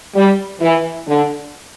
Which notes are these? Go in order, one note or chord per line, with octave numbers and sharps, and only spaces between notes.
G3
E3
D3